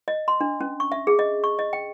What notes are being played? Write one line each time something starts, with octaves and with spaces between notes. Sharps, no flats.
D#5
C6
D4
C#4
C#6
E5
G#4
D#5
C#6
D#5
G5